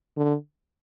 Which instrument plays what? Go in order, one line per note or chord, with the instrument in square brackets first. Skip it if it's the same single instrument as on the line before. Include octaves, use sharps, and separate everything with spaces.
[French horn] D3